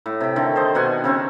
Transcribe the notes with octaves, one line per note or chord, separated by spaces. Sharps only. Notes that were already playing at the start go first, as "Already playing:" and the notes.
A2
C3 G5
D3 D#3 A3
A4 C5 D#5
B2 D#3 F#5 G#5
C#3 C4 C#4